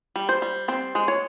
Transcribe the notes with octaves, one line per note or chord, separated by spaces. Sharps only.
G3
C5
G3
C4 C5
G#3
C#5